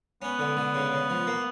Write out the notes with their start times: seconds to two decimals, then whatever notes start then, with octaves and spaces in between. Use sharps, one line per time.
0.22 B3 C#4
0.39 D3
0.57 D3
0.75 C#3
0.92 C#3
1.10 F3
1.27 A#3